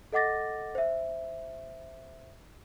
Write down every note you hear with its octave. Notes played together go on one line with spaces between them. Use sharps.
A4 D#5 F#5 D6 A6 A#6
C5 E5